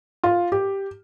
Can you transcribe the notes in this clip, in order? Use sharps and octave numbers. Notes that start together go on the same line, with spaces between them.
F4
G4